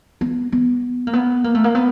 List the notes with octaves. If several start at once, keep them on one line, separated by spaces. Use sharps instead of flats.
B3
B3
A#3
B3
A#3
A3
A#3
B3